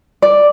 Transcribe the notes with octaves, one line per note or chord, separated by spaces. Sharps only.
D5